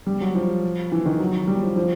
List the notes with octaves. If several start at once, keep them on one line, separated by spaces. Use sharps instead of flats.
G3
F#3
F3
E3
D#3
F#3
G3
F3
F3